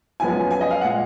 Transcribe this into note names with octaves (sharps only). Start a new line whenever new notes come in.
F#2 F3 G#3 B3 G#5
G#5
D#5
F5
A#2 G#3 F#5